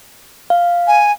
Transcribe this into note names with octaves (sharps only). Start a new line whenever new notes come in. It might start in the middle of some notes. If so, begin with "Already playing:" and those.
F5
G#5